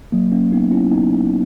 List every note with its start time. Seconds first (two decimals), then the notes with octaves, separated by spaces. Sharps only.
0.12 F#3 A#3
0.32 A#3 C#4
0.52 B3 D#4
0.71 C#4 E4
0.91 B3 D#4